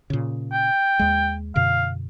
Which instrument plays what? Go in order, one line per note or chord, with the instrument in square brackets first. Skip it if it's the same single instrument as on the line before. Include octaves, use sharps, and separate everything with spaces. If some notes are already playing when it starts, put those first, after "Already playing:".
[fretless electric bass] A#2 C#3
[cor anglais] G5
[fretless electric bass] D#2 G#3
[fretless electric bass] F#2 B2 D3 [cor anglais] F5